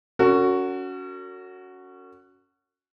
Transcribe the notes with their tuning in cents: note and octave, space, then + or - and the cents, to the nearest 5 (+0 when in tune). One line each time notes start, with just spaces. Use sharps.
C#4 +20 F#4 +0 A#4 -45